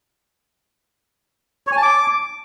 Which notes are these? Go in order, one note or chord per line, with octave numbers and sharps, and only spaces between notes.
C#5
G#5
A5
D6